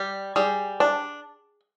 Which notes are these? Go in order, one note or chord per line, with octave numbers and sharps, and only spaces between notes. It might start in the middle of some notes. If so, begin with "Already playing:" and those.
Already playing: G3
G3 G#4
D4